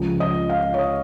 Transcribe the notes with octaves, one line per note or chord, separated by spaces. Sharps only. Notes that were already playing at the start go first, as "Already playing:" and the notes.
Already playing: C#2 C#3 F3
D#5
F5
C#5
D#5